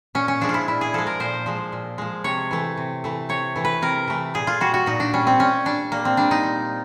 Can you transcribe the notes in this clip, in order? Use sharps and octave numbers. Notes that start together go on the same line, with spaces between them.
A#2 C#4
C#4
F3 G#3 D4
F4
E4
A#2 E4
G#4
F3 G#3 A4
A#4
A#2 C5
F3 G#3
A#2
F3 G#3
C3 C#5
E3 A3
C3
E3 A3
C3 C#5
E3 A3
B4
C3 A#4
E3 A3
A#2 G#4
F4
G3 F#4
F#4
A#2 D#4
D4
G3 C#4
C4
A#2 C#4
G3 D4
A#2 A#3
C4
G3 D4
D#4
A#2